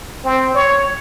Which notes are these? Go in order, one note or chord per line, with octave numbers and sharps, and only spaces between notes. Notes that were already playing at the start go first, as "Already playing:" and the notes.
C4
C#5